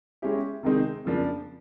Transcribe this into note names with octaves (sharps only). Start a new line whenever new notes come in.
G#3 C#4 E4 G4
C3 D#3 G#3 C4 D#4
F2 C#3 F3 A#3 D4